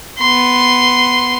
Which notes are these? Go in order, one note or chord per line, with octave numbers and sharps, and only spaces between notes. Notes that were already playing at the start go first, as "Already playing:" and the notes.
B3 C6